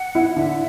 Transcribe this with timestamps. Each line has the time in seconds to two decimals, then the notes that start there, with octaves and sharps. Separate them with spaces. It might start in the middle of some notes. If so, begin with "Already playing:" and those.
Already playing: F#5
0.15 E4
0.36 D3 E5